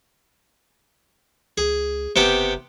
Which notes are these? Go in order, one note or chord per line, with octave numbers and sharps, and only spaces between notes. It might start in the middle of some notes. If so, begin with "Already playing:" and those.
C#2 G#4
F#1 C3 B3 G4